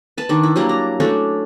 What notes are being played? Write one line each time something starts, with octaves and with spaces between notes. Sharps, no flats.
B4 A5
D#3 D4
E4
F#3 G3 A#3 D4
A#5
A3 C#4 D4 F#4